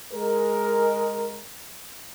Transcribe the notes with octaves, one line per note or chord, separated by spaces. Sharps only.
G#3 A#4